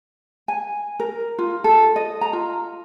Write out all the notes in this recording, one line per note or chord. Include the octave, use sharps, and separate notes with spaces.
G#5
A#4
F4
A4
D#5
A#5
F4